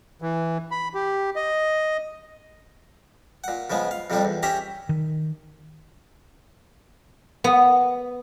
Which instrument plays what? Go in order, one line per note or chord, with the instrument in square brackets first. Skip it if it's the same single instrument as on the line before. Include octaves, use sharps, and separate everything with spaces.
[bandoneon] E3
B5
G4
D#5
[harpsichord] A#2 F#5
C#3 F3 G#3 B3
F5
F2 C3 F3 G3 D4
E2
C#4 G4 E5 G5 A#5
[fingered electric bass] D#3
[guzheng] B3